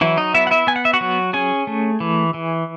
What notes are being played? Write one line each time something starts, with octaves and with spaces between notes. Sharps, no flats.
E3 F#3 E4
D#4 D#5
B3 E4 E5
F#5
E4 E5
B3 G#5
F#5
E5
F#4 F#5
F#3
C#4 G#4 G#5
A3
E3
E3